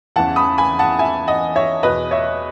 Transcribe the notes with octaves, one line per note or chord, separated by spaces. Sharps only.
E2 C#3 E3 F#5 A5
B5 D#6
G#5 B5
F#5 A5
E5 G#5
D#5 F#5
C#5 E5
E2 B2 B4 D#5
C#5 E5